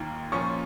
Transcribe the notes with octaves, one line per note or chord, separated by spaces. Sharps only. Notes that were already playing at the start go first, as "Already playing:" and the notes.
Already playing: D#2 D#3 A#3 F4
A#2 F3 C#4 F4 C#6